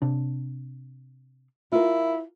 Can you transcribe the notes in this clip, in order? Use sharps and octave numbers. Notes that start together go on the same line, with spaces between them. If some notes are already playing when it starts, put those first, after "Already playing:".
C3 D4
E4 F4 A#4